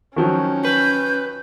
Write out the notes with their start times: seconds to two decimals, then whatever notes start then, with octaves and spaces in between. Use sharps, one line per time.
0.16 D#3 F3 F#3 C#4
0.65 B4 G6